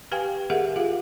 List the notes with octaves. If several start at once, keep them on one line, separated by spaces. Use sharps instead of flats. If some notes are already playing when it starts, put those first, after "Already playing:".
G4 B4 F5 G5 G#5
G4 G#4 A#4 E5 F#5
F4 G#4 F5